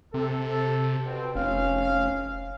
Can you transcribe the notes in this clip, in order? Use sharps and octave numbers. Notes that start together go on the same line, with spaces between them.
C3 A4
B2 C4
F1 C#4 F5